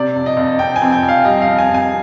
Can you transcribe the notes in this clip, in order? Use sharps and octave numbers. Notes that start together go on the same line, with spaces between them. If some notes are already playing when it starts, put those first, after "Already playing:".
Already playing: C3 D5
F2
D#5
F2
F2 G5
G#5
F2
G5
F2
F5
G3 D#5
F5
F2
G#5
F2
G#5